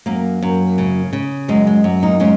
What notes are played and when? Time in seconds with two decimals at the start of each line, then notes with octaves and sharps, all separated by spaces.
0.06 F#2 A#3
0.43 F#2
0.78 C#3
1.13 C#3
1.48 F#2 G#3 C#4
1.67 G#3
1.84 F#2
2.03 A#3 D#4
2.20 C#3 G#3 C#4